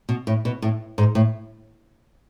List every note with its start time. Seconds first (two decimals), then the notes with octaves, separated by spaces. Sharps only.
0.09 B2
0.27 A2
0.45 B2
0.62 A2
0.98 G#2
1.15 A2